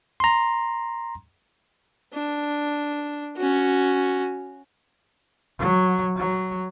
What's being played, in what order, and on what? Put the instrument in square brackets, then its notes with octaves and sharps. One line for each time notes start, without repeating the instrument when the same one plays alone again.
[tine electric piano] A#5 C6
[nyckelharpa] D4
C#4 F#4
[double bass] F#3
F#3